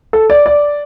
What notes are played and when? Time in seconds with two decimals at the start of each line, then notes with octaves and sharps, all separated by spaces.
0.13 A4
0.30 D5
0.46 D5